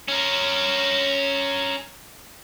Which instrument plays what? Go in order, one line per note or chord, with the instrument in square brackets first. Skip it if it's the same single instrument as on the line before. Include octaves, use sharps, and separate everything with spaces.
[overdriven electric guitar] C#4 A#4